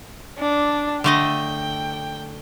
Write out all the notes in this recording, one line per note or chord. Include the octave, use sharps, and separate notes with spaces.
D4
D3 A3 D#5 G5